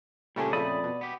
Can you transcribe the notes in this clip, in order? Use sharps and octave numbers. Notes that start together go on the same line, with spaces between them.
A#2 C#3 G3 A3 C#4 D4
F2 A#2 C#3 A3 D5 B5 D#6
B2
B3 G4